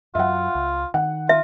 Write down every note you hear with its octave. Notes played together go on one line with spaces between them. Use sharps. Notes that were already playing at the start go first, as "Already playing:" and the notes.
F#2 F#3 F4 E5 F#5
C#2
D#3 F#5
F4 E5